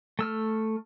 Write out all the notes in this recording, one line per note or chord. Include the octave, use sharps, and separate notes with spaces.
A3 E6 F6